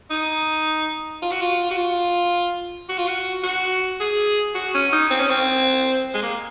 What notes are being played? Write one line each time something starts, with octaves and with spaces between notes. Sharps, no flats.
D#4
F4
F#4
F4
F#4
F4
F#4
F4
F#4
F#4
G#4
F#4
C#4
D#4
C4
C#4
C4
G#3
A#3